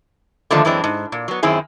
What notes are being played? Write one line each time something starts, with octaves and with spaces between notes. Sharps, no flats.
D3 D#3 F3 A3 A#3 D4
F#2 E3 G#3 C4 D4
G#2
A#2
F#3 B3
F#2 D#3 C4 E4 G#4